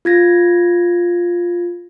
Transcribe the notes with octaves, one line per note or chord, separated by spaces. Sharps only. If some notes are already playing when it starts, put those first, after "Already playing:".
F4 G#6 A#6